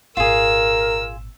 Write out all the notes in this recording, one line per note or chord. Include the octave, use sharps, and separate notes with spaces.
G#1 A#2 F4 G#4 A#4 E6